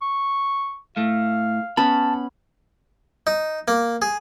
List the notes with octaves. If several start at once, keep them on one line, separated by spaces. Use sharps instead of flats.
C#6
A2 A3 F5
B3 C#4 A5 B5
D#4
A#3
G#4